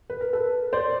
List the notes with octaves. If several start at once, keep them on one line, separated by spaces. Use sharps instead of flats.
B4
A#4
A4 B4
C5 D5